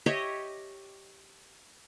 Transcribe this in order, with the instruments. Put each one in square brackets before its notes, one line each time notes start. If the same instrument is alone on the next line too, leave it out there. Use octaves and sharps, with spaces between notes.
[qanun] G4 C#5 D#5 E5